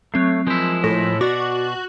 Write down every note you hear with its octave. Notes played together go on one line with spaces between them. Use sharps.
F#3 A3 C4 C#5 C7
F3 G#3 E4 A#4 G6
A2 A#6
B2 F#4 D5 D6